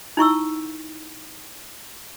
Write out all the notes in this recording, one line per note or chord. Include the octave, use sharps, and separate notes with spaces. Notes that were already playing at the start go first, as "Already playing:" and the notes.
D#4 E4 C#6 E6